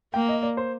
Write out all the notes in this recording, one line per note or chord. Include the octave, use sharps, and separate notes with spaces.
A#3 G5
D#5
D5
C5